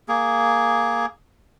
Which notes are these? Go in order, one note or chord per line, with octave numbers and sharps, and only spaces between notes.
A#3 G#4